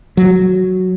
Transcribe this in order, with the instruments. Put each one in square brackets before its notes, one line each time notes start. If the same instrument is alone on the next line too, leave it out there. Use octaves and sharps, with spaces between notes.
[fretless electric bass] F#3